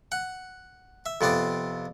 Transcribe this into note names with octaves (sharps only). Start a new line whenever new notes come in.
F#5
E5
F2 C3 B3 D5